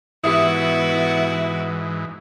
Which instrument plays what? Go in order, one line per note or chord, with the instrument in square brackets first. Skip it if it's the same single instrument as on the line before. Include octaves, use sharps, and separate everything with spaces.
[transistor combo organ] G#2 E3 [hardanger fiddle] B3 F#4 [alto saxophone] E4 [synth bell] G4 E5 D#6